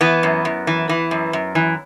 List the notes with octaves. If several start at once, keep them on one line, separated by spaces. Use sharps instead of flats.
E3 B3
F#2
F#2
E3
E3
F#2
F#2
E3